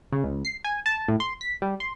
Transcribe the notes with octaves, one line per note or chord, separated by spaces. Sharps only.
C#3
C#2
C7
G#5
A5
A2
C6
B6
G3
C6